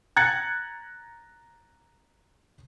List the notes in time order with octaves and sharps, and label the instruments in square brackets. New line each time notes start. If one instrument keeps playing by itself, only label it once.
[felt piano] A#5 F#6 G#6 A6 C#7